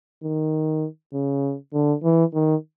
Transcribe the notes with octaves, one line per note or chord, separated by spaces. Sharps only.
D#3
C#3
D3
E3
D#3